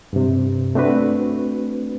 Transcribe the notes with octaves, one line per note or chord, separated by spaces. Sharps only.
G2 C3
A3 C4 D4 F#4 B4